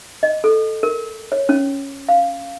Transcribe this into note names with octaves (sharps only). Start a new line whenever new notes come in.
D#5
A4
A#4
C#5
C#4
F5